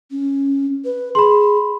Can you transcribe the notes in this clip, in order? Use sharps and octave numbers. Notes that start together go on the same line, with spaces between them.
C#4
B4
G#4 B5 C6